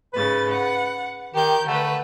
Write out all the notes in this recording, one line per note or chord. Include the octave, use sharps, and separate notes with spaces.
G#2 C#3 B4 A6
F#5
D#3 G4 G6
D3 A3 B4